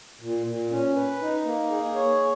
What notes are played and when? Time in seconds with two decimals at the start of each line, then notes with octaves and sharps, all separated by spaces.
0.21 A#2
0.46 A#2
0.71 C#4
0.96 B4
1.21 D#4
1.45 A#3
1.70 G#4
1.95 C#5